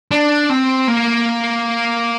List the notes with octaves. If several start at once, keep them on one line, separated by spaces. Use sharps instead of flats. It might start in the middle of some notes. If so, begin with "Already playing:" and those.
D4
C4
A#3